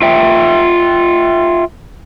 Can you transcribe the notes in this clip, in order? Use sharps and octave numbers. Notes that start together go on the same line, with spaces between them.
F4 E5 G5